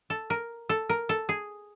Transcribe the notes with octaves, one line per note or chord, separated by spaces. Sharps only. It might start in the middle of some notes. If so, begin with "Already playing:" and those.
A4
A#4
A4
A#4
A4
G#4